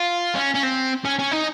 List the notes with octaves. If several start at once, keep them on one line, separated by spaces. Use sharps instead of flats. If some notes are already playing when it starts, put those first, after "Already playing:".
Already playing: F4
C#4
C#4
C4
C#4
C#4
D#4